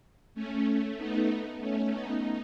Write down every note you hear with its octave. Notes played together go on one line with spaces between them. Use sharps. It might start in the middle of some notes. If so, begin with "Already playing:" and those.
A3 C#4
A3 C#4
B3 D#4
A3 C#4
B3 D#4